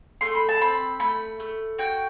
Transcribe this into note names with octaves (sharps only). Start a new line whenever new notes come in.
A3 C6
B5
A5
C4 B5
A3 B5
A3
F#4 G5